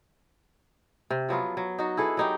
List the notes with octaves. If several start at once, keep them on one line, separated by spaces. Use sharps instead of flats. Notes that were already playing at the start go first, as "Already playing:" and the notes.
C3
F3 F#3 B3 F4
F#3
D#4 F#4
E4 G#4 A4 B4
F#3 D#4 G4